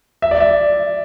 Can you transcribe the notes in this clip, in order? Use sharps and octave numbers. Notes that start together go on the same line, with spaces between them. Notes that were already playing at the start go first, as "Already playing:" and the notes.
E5
D5
E5